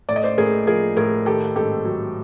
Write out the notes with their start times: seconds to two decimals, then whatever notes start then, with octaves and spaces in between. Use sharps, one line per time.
0.09 A2 D5
0.16 D#5
0.24 C5 D5
0.38 A2 G#4 A#4
0.67 F3 G#4 A#4
0.97 A2 G#4 A#4
1.26 D#3 G4 A4
1.56 G#2 G4 A4
1.85 F#3